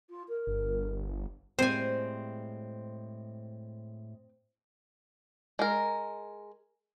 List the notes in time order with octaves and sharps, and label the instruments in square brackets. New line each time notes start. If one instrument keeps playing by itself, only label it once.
[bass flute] F4
A#4
[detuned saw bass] G1
[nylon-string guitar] A2 G3 G#3 [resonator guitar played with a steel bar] C4 [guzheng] C5 G#5
[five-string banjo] G#3 A#4